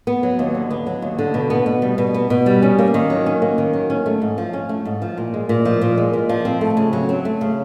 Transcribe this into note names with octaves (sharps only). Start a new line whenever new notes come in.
B3
F#3
D#2
D3
B3
F#3
D#2
D3
B2
B3
B2
G3
B2
B3
B2
G3
C#4
A#3
D#3
F#3
C#4
A#3
D#3
F#3
C#4
A3
G#2
F3
C#4
A3
G#2
F3
A#2
G#3
A#2
F3
A#2
G#3
A#2
F3
C4
A3
C#3
F#3
C4
A3
C#3